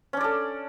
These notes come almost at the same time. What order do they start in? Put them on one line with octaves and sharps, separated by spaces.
C#4 D4 D5 A4